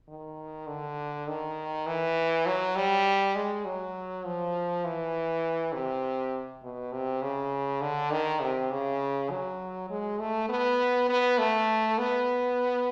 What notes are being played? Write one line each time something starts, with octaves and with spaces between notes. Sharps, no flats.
D#3
D3
D#3
E3
F#3
G3
G#3
F#3
F3
E3
C3
B2
C3
C#3
D3
D#3
C3
C#3
F#3
G#3
A3
B3
B3
A3
B3